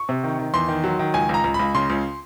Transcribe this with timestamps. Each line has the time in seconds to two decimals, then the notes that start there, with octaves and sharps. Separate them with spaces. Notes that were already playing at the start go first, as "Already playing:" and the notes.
Already playing: C#6
0.09 C3
0.24 D#3
0.39 D#3
0.54 E2 C6
0.68 D#3
0.84 F#3
0.99 D#3
1.14 C#2 G#5
1.29 C#2 A#5
1.44 C#2
1.54 B5
1.59 C#2
1.75 C#3 C6
1.90 C#2